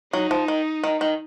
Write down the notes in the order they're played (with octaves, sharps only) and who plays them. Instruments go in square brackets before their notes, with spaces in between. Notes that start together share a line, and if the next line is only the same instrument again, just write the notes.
[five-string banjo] F#3 [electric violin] D#4
[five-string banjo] F3
D#3
D#3
D#3